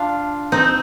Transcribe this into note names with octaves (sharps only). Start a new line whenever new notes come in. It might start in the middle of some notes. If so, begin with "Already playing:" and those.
Already playing: D4 F4
C4 D#4